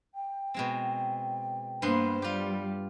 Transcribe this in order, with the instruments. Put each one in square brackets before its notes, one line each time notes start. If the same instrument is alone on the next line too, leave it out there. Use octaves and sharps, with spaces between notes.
[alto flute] G5
[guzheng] B2 G#3 C4
[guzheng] G2 B3 C6 [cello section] A#3 C5
[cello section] G3 [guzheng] F4 G4